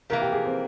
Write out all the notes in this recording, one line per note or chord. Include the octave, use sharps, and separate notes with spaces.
C3 E3 A#3 A#4
G4
G#4
C4